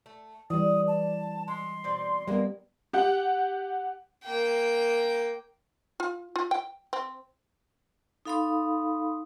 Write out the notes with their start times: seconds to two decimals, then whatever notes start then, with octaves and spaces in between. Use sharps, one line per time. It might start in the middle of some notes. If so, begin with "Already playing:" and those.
0.06 A3
0.50 E3 G3 D5 D#6
0.87 A5
1.48 G#3 C6
1.84 B2 C4 D5
2.28 G3 G#3 A#3 B3 A#4
2.93 G4 F#5
4.25 A#3 G5
6.00 F4
6.36 F4
6.51 G5
6.93 C4
8.25 D#4 A4 F5 B5 C6 D#6